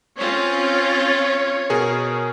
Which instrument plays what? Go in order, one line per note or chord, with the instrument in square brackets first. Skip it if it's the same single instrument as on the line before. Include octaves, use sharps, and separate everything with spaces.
[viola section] C4 C#4 F4 [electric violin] C#5
[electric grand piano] B2 G#4 A#4